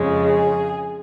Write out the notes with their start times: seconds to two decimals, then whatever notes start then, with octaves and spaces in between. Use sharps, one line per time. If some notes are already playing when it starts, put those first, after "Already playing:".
Already playing: F2 C#3 G#3
0.27 G#4